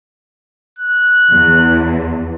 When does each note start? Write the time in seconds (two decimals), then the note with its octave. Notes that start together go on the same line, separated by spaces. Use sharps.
0.79 F#6
1.31 E2